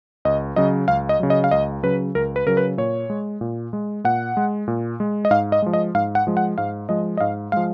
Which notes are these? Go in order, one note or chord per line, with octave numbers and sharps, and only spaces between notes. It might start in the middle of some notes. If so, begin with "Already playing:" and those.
C#2 D#5
C#3 F#3 D#5
C#2 F5
D#5
C#3 F#3
D#5
F5
C#2 D#5
C#3 F#3 B4
C#2 A#4
B4
C#3 F#3 A#4
B4
A#2 C#5
G#3
A#2
G#3
A#2 F#5
G#3
A#2
G#3
D#5
G#2 F5
D#5
F3 G#3
D#5
G#2 F5
F#5
F3 G#3
F#5
G#2 F5
F3 G#3 D#5
D#5
G#2 F5
F3 G#3 F5